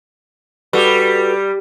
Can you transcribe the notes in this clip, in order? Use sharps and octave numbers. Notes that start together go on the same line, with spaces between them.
G3 F#4 A4 B4